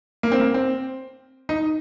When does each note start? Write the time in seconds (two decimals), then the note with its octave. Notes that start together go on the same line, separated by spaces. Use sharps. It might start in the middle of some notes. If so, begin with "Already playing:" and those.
0.23 A#3
0.32 C4
0.40 A#3
0.54 C4
1.49 D#4